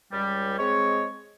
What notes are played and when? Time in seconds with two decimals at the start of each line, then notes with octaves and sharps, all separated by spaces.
0.12 C#2 G3
0.57 G#3 C4 C#5